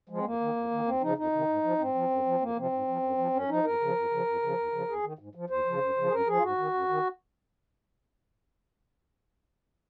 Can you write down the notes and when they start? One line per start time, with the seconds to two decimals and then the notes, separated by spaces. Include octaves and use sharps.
0.09 F3 G#3
0.18 C4
0.25 F2 A#3
0.40 D#3
0.56 F2
0.71 D#3
0.86 D#2 C4
1.01 C#3 F3 D#4
1.18 F2 D#4
1.33 C3 D#3
1.48 G#2
1.63 F3
1.79 G#2 C4
1.95 F3
2.11 F#2
2.26 F3
2.41 F2 A#3
2.57 C3 F3 C4
2.72 G#2
2.88 F3
3.03 F#2
3.18 F3
3.34 F#2 C#4
3.49 F3 D#4
3.64 F2 A#4
3.81 C#3 F3
3.96 F2
4.11 C#3 F3
4.27 F2
4.42 C#3 F3
4.57 D#2
4.72 C#3 F3
4.88 D#2 G#4
5.03 D#3
5.19 G#2
5.35 F3
5.50 D#2 C5
5.65 C#3 F3
5.81 F#2
5.97 C#3 F3
6.08 G#4
6.11 F#2 A#4
6.27 F3 G#4
6.37 F4
6.43 G#2 F#4
6.58 D#3
6.74 F#2
6.89 D#3